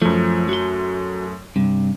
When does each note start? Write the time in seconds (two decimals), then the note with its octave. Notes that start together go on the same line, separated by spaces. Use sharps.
0.02 F#2 F3 A3
0.49 F#4 C6
1.56 G2 C3